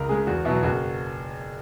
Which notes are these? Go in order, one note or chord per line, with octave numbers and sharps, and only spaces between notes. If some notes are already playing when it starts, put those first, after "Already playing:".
Already playing: C#2 A#4
C#3 G#3 G#4
E2 F#4
B2 F#3 E4
F#1 F#4